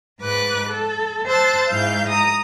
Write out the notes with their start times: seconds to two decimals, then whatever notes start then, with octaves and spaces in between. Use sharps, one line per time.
0.21 G#2 B4 D6 F#6
0.70 A4
1.27 C5 A5 E6 F#6 A6
1.68 G#2 E4 F5 G6
2.10 A#5 D#6